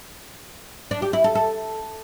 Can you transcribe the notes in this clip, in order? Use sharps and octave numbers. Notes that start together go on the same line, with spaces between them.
D4
G4
E4
A4
A4